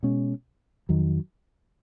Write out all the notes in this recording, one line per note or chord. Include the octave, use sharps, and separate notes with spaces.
B2 G#3 C#4
F2 D#3 F#3